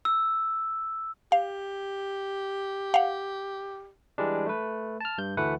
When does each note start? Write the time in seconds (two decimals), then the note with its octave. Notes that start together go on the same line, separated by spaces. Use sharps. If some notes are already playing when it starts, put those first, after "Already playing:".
0.05 E6
1.32 G4 F5
2.94 F5 F#5
4.18 E3 G3 G#3 D4
4.47 A3 B4
5.00 A5 F6
5.18 G2 G6
5.37 D2 E3 A3 B4 F#5